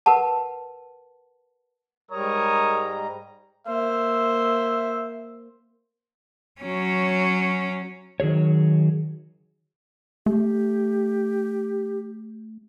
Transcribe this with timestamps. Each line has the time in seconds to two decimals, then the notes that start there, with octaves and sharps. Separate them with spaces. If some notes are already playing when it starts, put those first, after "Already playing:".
0.06 A#4 B4 F#5 A5
2.11 G#2 G3 A#4 C#5 A#5 D#6
3.67 A#3 C5 E5
6.62 F#3 C#4
8.20 D#3 F#3 G#4 C#5
10.26 A3 G4